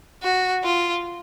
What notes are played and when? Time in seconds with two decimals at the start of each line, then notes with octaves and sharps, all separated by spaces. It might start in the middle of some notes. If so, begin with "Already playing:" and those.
0.23 F#4
0.63 F4